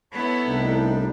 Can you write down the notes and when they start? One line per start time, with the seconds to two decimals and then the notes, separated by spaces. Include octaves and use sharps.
0.13 B3 E4 A4 C#5 A5 B5
0.46 C2 A2 G3 D4 D#4